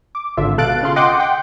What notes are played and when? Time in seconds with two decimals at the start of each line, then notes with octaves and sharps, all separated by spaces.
0.15 D6
0.37 G#1 D3 F4 E5
0.58 B2 A4 F5 F#6 A6 D7
0.83 C#3 F4 C6
0.96 D#5 F#5 G5 C6 D6
1.17 F#5 G5